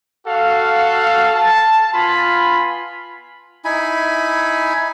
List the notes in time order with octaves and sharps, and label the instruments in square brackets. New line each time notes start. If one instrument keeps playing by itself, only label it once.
[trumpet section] F#4 A4 F5
A5
B3 F4 G#5 B5
[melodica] D#4 E4 G#5 B5